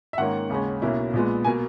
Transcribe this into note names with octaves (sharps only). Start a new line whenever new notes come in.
E5
G#2 D#3 A#3 C#4 F#5
D#2 C#3 G#3 C#4
B1 B2 A#3 C#4 E4
A#1 A#2 G#3 B3
B2 A#3 G#5